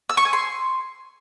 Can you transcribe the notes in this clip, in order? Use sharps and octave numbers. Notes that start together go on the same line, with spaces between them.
E6
C#6
G#5
C6